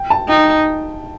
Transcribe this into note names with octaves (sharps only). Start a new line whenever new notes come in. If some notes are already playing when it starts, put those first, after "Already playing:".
Already playing: G5
A5
D#4 G5